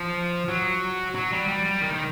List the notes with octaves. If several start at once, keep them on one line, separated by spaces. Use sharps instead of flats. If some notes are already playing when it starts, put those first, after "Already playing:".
Already playing: F3
F#3
F#3
G3
G3
G3
D#3
D#3